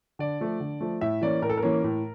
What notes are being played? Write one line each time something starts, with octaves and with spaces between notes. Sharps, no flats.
D3 D5
F3 A3
D3
F3 A3
A2 E5
E3 A#3 C#4 D5
A2 A#4
A4
A#4
E3 A#3 C#4
A2